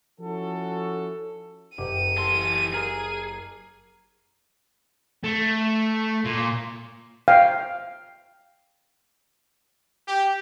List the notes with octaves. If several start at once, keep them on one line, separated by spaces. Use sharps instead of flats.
F3 C#4 E4 F#4 A4
F#1 G4 D#7
E3 A4 C6
G#4 A#4 F#5
A3
A#2
F5 G5
G4